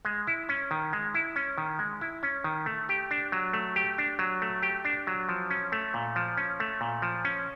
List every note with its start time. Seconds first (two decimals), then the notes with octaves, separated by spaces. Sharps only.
0.05 G#3
0.27 E4
0.49 C#4
0.71 D#3
0.93 G#3
1.15 E4
1.36 C#4
1.58 D#3
1.79 G#3
2.01 E4
2.23 C#4
2.44 D#3
2.66 A3
2.89 G4
3.11 D4
3.32 F#3
3.53 A3
3.76 G4
3.98 D4
4.19 F#3
4.42 A3
4.62 G4
4.85 D4
5.07 F#3
5.29 F3
5.50 C#4
5.72 A3
5.94 A#2
6.16 F3
6.37 C#4
6.60 A3
6.81 A#2
7.02 F3
7.25 C#4